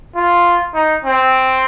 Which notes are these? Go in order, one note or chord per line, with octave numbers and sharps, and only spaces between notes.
F4
D#4
C4